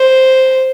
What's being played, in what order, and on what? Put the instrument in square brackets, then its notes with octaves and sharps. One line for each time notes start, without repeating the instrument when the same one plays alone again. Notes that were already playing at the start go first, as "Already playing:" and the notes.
Already playing: [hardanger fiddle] C5